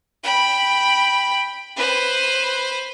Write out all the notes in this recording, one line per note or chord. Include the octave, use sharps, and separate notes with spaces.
G5 B5
B4 C5